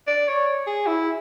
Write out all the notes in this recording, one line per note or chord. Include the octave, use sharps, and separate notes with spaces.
D5
C#5
G#4
E4